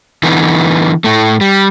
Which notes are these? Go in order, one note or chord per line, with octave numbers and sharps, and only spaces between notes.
D3 E3 B3 D#4
A2 A3
G3